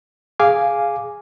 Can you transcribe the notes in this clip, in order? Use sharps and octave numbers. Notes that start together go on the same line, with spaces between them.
G#4 F5 G#5 D6